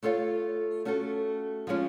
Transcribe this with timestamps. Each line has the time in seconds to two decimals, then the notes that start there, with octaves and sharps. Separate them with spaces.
0.03 A3 F4 A4 C#5 F5
0.85 A3 C#4 F#4 A4
1.67 F3 G#3 C#4 F4